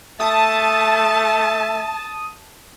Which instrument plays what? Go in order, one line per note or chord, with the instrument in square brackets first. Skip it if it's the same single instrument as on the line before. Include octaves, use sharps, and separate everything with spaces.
[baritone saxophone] A3 [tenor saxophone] E5 [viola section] A5 [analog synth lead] D#6